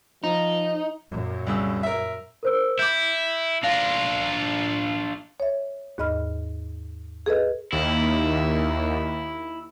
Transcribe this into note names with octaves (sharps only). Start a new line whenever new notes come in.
F3 D#4
F#2 A#2
C2 C#3 E6
A#4 E5
A#4 C5 E6
E4 D6 G6
D4 F4 F5 A#6 F7
C#5 E5
D#2 G#2 D#5 B5 F6
G#4 A4 B4 D#5
D#2 E4